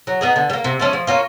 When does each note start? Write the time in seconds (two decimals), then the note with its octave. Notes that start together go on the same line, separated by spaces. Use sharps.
0.07 F#3
0.21 B3 D#4 G#4
0.36 D3
0.50 G3
0.53 A#3
0.64 C3
0.79 F3 A3 C#4
0.93 F3
1.07 A#3 C#4 F4